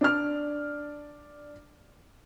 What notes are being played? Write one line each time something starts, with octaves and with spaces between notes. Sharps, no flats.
D4 D5 F6